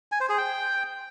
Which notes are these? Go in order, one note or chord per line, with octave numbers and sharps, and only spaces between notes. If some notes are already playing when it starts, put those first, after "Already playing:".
G#5
C5
G#4
G5